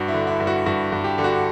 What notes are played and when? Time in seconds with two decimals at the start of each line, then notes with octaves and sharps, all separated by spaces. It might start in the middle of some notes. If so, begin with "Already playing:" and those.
Already playing: G2 F#4
0.08 E4
0.14 D3
0.27 E4
0.40 G2
0.47 F#4
0.66 G2 F#4
0.92 G2
1.04 G4
1.18 D3
1.24 F#4